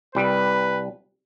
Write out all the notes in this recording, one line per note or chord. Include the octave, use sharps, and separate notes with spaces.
C2 G3 B4